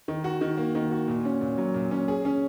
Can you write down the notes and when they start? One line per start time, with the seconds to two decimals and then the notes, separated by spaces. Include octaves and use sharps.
0.08 D#3
0.24 F#4
0.41 D#3
0.57 A#3
0.75 D#3
0.91 F#4
1.08 A#2
1.25 C#4
1.41 A#2
1.58 F#3
1.74 A#2
1.91 C#4
2.08 G#4
2.25 C#4